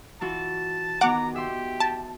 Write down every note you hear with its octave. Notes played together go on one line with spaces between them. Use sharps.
E3 F4 F#4 A5
D#3 B3 F#4 F#5 A#5 D6
G4 E5 C6
A5